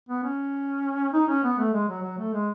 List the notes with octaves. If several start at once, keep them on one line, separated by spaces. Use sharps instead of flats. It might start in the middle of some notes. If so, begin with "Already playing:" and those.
B3
C#4
D#4
C#4
B3
A3
G#3
F#3
F#3
A3
G#3